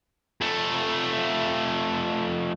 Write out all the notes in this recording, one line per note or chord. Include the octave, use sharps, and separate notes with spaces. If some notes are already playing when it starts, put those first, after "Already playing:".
F2 A3